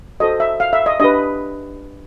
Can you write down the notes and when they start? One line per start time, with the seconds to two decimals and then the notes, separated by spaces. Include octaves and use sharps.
0.20 F#4 A4 C5 D#5
0.40 E5
0.60 F5
0.73 E5
0.86 D#5
1.00 D4 G4 B4 D#5